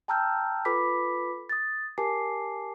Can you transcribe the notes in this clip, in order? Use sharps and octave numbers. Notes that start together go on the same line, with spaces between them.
G5 A5 A#5 E6 F6 G6
F4 A4 B4 B5 D6 B6
D#6 A6
G4 A#4 G#5 A5 D6 C7